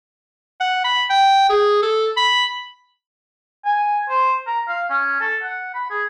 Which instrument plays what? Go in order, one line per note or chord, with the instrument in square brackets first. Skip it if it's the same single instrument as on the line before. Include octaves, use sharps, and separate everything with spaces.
[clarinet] F#5
B5
G5
G#4
A4
B5
[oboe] G#5
C5
A#5
F5
C#4
A4
F#5
B5
G#4